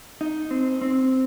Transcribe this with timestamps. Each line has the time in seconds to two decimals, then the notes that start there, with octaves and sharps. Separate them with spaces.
0.21 D#4
0.51 C4
0.81 C4